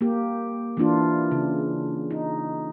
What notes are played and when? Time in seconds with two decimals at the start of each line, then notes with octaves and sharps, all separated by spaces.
0.01 A#3 G4
0.77 E3 A#3 D4 F4
1.31 C#3
2.11 D#4